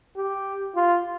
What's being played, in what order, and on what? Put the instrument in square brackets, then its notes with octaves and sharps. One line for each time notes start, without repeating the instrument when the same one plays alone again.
[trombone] G4
F4